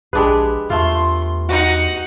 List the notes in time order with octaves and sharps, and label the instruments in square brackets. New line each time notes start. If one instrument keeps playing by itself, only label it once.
[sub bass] A#1 [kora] G#3 D4 G#4 [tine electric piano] G4 B4
[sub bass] E2 [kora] A3 F4 [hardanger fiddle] C6
[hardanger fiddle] D#4 F#5 [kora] F#4